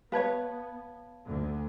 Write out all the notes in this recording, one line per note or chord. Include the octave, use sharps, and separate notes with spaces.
B3 B4 C#5 F5 A5 G#6
D2 D3